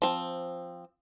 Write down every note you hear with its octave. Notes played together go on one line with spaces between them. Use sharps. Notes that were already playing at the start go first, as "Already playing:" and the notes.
F3 C4